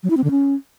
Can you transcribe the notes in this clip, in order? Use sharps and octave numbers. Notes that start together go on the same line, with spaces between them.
F#3
E4
C4
D3
C#4